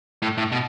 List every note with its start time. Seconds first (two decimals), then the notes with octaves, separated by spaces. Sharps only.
0.22 A2
0.38 A2
0.52 B2